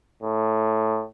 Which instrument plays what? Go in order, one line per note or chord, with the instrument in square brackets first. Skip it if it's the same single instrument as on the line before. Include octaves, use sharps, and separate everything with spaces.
[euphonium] A2